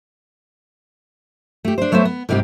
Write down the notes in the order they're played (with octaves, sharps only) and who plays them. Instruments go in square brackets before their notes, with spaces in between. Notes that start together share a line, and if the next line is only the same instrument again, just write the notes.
[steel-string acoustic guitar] A3 G4
D4 C5
F#3 A3 B3 C5 E5
B3
G#2 C3 G3 C4 G4